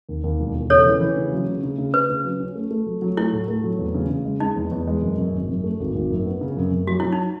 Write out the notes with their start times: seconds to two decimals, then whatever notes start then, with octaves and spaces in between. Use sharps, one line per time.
0.09 D#2
0.24 D#2
0.39 E1
0.55 E1
0.70 C#3 A4 C#5
0.86 E3
1.01 E3
1.17 C#3
1.32 F#3
1.47 C#3
1.63 C#3
1.78 C#3
1.94 C#3 B4
2.09 C#3
2.25 F#3
2.40 C#4
2.55 A3
2.71 A3
2.86 F#3
3.02 F#3
3.17 A3 E4
3.32 A2
3.48 A3
3.64 F#3
3.79 E2
3.94 C#3
4.10 C#3
4.25 G#3
4.40 G#3 D#4
4.56 E2
4.71 E2
4.87 G#3
5.02 F#2
5.18 F#2
5.33 G#1
5.49 F#2
5.64 A3
5.80 G#1
5.95 G#1
6.10 F#2
6.26 B3
6.41 C#3
6.57 F#2
6.72 F#2
6.87 F#3 F#4
7.00 F#3 E4
7.12 D#4